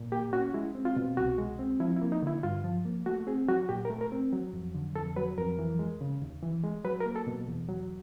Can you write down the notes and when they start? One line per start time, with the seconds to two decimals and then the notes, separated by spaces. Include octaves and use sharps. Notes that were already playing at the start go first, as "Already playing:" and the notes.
Already playing: A#2
0.12 A#3 G4
0.33 C#4 F#4
0.54 G#3 E4
0.75 C4
0.85 F4
0.96 B2
1.17 C2 F#4
1.38 G#3
1.59 C4
1.80 F3 E4
1.97 E4
2.01 A#3
2.12 D#4
2.23 D3 E4
2.43 G2 F4
2.64 F3
2.85 A#3
3.06 A3 F#4
3.27 C4 G#4
3.48 F#3 F#4
3.69 A#2 G4
3.85 A#4
3.90 A3
4.01 A#4
4.12 C4
4.32 F#3
4.53 F2
4.75 D3
4.96 F2 A4
5.16 F#3 B4
5.38 F2 A#4
5.59 E3
5.79 G#3
6.01 C#3
6.22 D#2
6.43 E3
6.64 G#3
6.85 F#3 B4
7.00 A#4
7.06 A#3
7.16 A4
7.27 B2
7.48 E2
7.69 F#3